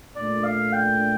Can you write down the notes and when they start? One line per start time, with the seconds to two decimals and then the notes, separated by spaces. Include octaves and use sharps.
0.16 A#2 A3 D4 D5
0.44 F5
0.73 G5